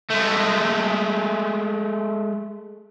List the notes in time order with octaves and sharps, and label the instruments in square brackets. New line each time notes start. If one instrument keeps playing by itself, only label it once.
[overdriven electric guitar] G#3 A3